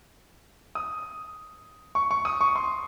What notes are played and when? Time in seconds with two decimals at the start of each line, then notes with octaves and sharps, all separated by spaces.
0.75 D#6
1.95 C#6
2.11 C#6
2.25 D#6
2.41 C#6
2.56 C6